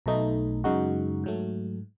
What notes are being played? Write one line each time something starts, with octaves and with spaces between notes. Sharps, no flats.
B1 B2 A3 D#4
F#2 C#3 G#3 D#4 F#4
G#2 F#3 A3